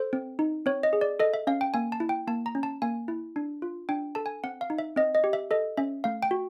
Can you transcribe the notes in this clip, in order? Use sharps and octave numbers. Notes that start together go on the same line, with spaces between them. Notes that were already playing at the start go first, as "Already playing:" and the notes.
Already playing: A4 C5
C4
D#4
C4 C#5
D#5
G#4
D5
A4 D#5
E5
C#4 F5
G5
A#3 G#5
A5
E4
G5
A#3 A5
A#5
C#4
A5
A#3 G#5
E4
D4
F4
D4 G5
A4 A5
G#5
C4 F#5
F5
D#4
E5
C4 D#5
D#5
G4
E5
A4 D#5
C#4 E5
A3 F5
G5
F#4